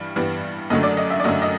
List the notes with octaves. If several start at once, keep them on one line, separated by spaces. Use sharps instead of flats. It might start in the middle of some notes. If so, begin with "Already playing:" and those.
Already playing: G2 E3 G3
G2 E3 G3 B3
F#2 D3 F#3 A3 D#5
D5
D#5
E5
D5
F#2 D3 F#3 A3 D#5
D#5